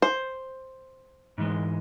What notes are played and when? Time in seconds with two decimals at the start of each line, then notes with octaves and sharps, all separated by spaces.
0.02 C5
1.38 G#2 E3 G#3